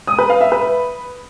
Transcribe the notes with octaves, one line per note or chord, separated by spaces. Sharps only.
D#6
B4
F5
E5
B4